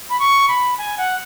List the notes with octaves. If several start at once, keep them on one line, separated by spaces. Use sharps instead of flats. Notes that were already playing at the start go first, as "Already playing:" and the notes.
B5
C#6
B5
G#5
F#5